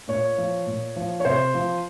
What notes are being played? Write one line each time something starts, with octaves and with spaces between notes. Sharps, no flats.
A#2 C#5
F3
A#2
F3
C#5
C3 C5
F3